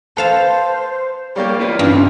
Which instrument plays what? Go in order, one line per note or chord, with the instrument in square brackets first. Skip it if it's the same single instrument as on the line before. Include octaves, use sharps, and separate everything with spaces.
[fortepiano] A4 [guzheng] B4 F5 A5 [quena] C5
[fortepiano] G3 A#3 G4 [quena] C#5
[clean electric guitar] E4 B4 G5 [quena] F4
[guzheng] G2 [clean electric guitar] C#3 C4 C#4